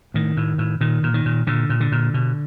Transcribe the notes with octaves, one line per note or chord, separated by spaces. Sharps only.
A2 D#3
A2
A2
A#2 D#3
A#2
D#3
A#2
A#2 D3
A#2
D3
A#2
B2